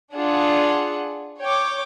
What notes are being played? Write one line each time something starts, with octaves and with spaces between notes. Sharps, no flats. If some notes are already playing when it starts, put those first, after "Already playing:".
D4 F4 G#4 F#5
C#5 G5 D6